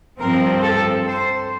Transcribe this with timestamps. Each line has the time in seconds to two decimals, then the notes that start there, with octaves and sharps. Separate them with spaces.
0.19 G2 F3 C4 A#4
0.63 A4
1.07 C5